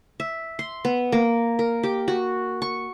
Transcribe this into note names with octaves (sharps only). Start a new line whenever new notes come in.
E5
C6
B3
A#3
A#4
G4
F#4
C#6